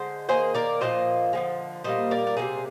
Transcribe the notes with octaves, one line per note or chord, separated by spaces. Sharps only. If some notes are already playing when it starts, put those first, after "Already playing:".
Already playing: D3 G#3 C5
D#3 A#3 G#4 C5
A#4 D5
A#2 F3 A#3 C5 D#5
D3 F3 G#3
A#2 G3 A#3 C5 D#5
A#4 D5
A#4
C3 G3 A#3 G#4 C5